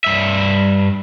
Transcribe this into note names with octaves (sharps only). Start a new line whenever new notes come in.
G2 E5